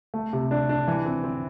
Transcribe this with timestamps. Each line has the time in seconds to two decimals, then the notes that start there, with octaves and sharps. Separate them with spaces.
0.14 A3
0.33 C3
0.51 D4
0.69 D4
0.88 E3
1.05 C4
1.24 C4